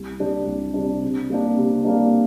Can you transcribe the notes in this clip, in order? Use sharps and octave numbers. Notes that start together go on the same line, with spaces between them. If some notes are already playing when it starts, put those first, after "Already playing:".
Already playing: C2
C3 G3 D4
C2
C3 G3 D4
C3
G3 A#3 D4
C3
G3 A#3 D4